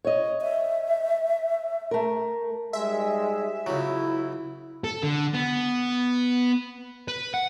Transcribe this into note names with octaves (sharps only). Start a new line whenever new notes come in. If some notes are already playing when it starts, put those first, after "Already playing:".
C#5 D#5
E5
A3 A#4
G#2 G3 G#3 E5
C#2 F#3 E4
A4
D3
B3
B4
F#5